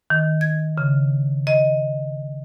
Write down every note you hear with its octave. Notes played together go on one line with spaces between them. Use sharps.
D#3
G#6
C#3
D#5